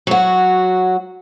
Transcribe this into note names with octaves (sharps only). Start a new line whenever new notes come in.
F#3 F#4